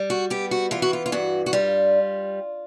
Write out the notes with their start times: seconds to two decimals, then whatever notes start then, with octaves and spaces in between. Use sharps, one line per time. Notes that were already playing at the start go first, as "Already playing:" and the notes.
Already playing: G3
0.10 F#4
0.30 B3 G4
0.51 F#4
0.71 E3 F4
0.82 F#4
0.93 F4
1.06 F4
1.12 G2 F#4
1.46 F#4
1.53 G3 F4